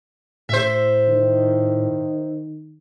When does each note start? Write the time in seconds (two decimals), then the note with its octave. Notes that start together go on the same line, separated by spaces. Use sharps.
0.49 A2 C5 E5
1.08 D#3